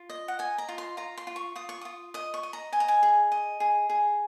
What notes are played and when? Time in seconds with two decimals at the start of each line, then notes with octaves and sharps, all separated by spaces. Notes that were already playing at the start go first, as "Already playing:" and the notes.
Already playing: F4
0.09 D#5
0.28 F#5
0.39 D#5 G#5
0.58 A#5
0.69 F4
0.78 C6
0.97 F4 A#5
1.17 C6
1.27 F4
1.36 C#6
1.56 F4 D#6
1.69 C#6
1.81 F4 D#6
2.14 D#5 D#6
2.34 C#6
2.43 D#5
2.53 A#5
2.72 D#5 G#5
2.80 A#5
2.88 G#5
3.03 G#4
3.32 D#5
3.60 G#4
3.90 G#4